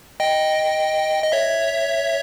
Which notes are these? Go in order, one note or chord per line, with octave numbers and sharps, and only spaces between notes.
D#5 G5
D#5
C#5 E5